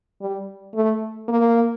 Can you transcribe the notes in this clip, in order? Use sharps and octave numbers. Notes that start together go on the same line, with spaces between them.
G3
A3
A#3